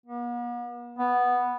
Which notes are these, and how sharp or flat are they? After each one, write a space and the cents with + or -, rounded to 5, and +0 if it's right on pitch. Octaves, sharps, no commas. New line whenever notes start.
B3 -45
B3 -5